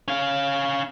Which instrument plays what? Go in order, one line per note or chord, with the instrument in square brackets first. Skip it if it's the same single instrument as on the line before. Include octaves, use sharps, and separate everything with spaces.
[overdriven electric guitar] C#4 F5